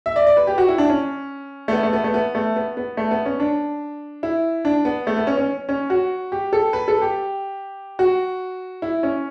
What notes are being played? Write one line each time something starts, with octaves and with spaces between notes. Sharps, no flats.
E5
D5
D5
B4
G4
F#4
E4
D4
C#4
A3
B3
A3
B3
A3
B3
A3
B3
B3
A3
B3
C#4
D4
E4
D4
B3
A3
B3
C#4
C#4
C#4
F#4
G4
A4
B4
A4
G4
F#4
E4
C#4